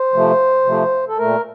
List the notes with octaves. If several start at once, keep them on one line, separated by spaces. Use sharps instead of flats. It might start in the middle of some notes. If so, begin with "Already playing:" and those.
Already playing: C5
C3 F3 A3
C3 F3 A3
A4
A#2 A3 A#4